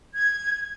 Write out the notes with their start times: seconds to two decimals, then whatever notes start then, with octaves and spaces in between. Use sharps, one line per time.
0.15 G#6